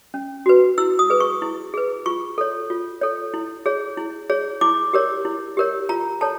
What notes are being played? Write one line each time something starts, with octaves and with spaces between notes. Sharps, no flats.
C#4
F#4 B4
E4 E6
D#6
G#4 B4
C#6
E4
G#4 B4
F4 C#6
A4 C#5
F4
A4 C#5
E4
G#4 C#5
E4
G#4 C#5
E4 D6
G4 A#4 C#5
E4
G4 A#4 C#5
F4 A#5
A4 C#5 A5